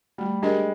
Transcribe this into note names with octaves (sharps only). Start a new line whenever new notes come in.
G3 A3
G#3 D4 G4 A#4